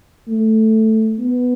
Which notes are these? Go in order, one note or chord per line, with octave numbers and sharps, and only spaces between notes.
A3
B3